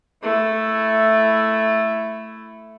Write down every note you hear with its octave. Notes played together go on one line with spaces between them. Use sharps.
A3 E4